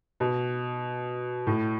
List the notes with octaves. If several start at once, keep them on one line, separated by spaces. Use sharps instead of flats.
B2
A2